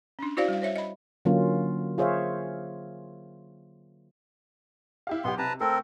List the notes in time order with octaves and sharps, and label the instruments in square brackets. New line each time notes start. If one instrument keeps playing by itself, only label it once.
[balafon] C#4 D4
E4 F#4 C5 D5 F5
G3 F5
C5 C#5 E5
D#5 B5
[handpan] D3 F#3 A#3 C#4 F4
F4 G#4 C5 C#5 E5 F5
[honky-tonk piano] E4 G4 F5
[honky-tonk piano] B1 G4 [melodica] B3 C6
[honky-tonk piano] C3 [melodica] B4 A5 A#5
[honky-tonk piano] A3 [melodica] C4 A4 A#4